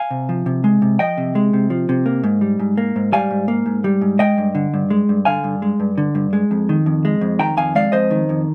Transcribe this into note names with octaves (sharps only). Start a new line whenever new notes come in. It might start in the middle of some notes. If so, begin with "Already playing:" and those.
Already playing: F5 G#5
C3
F3
C3
G#3
C3
F3 D#5 G5
C3
G#3
C3
F3
C3
A#3
G#2
G3
G#2
A#3
G#2
G3 F5 G#5
G#2
A#3
G#2
G3
G#2
G#3 D#5 G5
G2
D3
G2
G#3
G2
D3 F5 G#5
G2
G#3
G2
D3
G2
G#3
F2
D#3
F2
G#3
F2
D#3 G5 A#5
F2 F5 G#5
G#3 D5 F5
F2 C5 D#5
D#3
F2